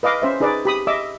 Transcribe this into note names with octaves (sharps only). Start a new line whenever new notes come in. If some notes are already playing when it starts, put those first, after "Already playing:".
B4 D#5 F5 D6
C#4 C5 E5
D#4 G#4 B4 D5
G4 B5 D#6
D#5 E5 D6 E6